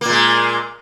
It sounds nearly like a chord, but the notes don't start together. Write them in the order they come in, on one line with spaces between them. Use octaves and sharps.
A#3 A#2 G#3